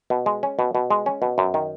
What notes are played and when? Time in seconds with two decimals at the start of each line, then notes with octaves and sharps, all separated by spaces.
0.10 B2
0.26 G#3
0.43 C#4
0.59 B2
0.75 B2
0.90 G#3
1.06 C#4
1.22 B2
1.38 F#2
1.54 D#3